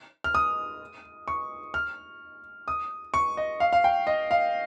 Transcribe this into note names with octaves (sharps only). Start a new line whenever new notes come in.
F6
D#6
C#6
F6
D#6
C#6
D#5
F5
F5
G5
D#5
F5